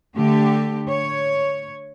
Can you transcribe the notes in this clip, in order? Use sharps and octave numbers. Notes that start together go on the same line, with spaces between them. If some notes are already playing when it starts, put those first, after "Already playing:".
D3 A3 G4
C#5